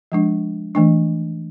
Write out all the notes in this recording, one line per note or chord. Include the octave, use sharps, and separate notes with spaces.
F3 G#3 D4
E3 A3 D4